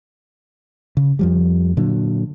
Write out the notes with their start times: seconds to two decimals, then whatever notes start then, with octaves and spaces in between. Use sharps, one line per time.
0.97 C#3
1.19 F2 F3 G3
1.77 A#2 D3 F#3